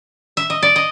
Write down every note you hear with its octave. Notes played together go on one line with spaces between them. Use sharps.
E5
D#5
D5
D#5